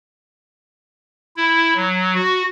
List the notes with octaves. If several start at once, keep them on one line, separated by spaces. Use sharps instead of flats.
E4
F#3
F#4